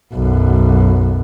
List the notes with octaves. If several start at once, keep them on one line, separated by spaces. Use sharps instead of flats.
B1 F#2